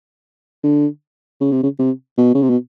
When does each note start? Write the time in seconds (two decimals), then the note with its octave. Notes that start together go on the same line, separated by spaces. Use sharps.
0.64 D3
1.41 C#3
1.52 C3
1.63 C#3
1.79 C3
2.18 B2
2.35 C#3
2.42 C3
2.50 B2